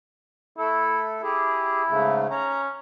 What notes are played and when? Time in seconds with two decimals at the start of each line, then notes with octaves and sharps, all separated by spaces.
0.58 A3 E4 A4
1.22 E4 G4 G#4
1.89 G#2 C#3 A3
2.31 C#4 A#5